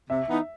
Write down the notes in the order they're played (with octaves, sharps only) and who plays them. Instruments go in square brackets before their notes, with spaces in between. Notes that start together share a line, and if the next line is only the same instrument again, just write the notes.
[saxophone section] C3 [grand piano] E5
[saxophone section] E3 B3 D#4